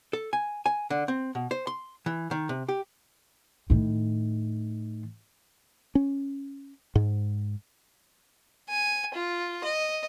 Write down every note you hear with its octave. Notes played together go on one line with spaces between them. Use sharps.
A4
G#5
G#5
D3
C4
B2
C5
C6
E3
D#3
C3
G4
A2 D#3
C#4
G#2
G#5
F4
D#5